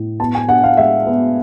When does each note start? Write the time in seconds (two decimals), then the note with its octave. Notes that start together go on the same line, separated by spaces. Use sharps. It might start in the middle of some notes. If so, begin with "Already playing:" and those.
Already playing: A2
0.20 B3 A5
0.35 G#5
0.49 D4 F#5
0.64 F5
0.77 G#3 E5
1.06 B3